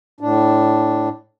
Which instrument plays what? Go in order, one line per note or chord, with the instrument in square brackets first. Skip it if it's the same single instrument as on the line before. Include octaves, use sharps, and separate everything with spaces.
[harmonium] A2 D4